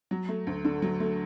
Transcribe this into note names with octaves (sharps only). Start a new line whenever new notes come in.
F#3
A3
D2
D3
F#3
A3